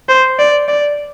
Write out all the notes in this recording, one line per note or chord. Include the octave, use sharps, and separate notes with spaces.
C5
D5
D5